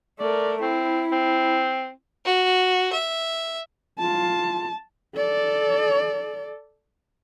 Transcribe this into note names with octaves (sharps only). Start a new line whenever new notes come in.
A3 A#4 D5
C4 E4
C4
F#4
E5
F4 A5
A4 D5